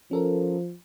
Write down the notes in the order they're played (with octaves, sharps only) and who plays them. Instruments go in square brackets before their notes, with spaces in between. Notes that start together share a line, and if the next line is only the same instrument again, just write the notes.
[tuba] F3 [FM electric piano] C#4 A4 A#4